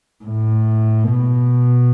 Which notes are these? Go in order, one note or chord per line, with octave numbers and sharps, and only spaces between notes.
A2
B2